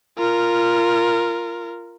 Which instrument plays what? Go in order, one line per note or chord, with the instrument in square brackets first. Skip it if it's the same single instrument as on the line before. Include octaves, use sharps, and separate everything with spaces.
[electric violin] F4 A#4